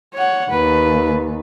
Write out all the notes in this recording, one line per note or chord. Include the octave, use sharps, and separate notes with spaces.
C#5 F#5
D#2 B4